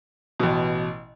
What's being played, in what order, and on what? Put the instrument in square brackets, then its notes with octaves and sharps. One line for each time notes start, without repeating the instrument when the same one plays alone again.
[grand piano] A1 B2